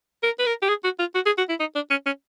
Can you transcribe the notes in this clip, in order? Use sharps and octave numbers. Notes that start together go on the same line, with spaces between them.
A#4
B4
A#4
G4
G#4
F#4
F4
F#4
G#4
F#4
E4
D#4
D4
C#4
C#4